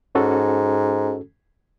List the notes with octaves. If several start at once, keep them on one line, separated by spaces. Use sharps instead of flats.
G#2 C#4 F#4 A4